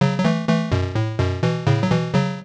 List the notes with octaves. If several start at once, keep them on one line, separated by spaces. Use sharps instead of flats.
C#3 F#3
F#3
E3 A3
E3 A3
F#2 B2
A2
F#2 B2
B2 E3
A2 C#3
F#3
B2 E3
C#3 F#3